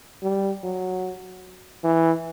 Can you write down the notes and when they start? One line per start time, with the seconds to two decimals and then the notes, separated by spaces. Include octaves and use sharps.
0.22 G3
0.64 F#3
1.84 E3